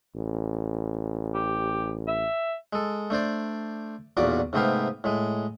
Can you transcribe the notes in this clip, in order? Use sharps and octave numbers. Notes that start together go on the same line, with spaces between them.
A1
G4
E5
G#3 A4
A3 D4 C5 D5
B1 E2 A#2 F#4 D5 D6
G#2 C3 A3 B3 G4 F5
A2 G#3